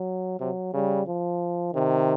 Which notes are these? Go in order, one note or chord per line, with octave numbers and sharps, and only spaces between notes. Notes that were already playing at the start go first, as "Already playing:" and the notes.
Already playing: F#3
C3 F#3
C#3 G3
F3
C3 D#3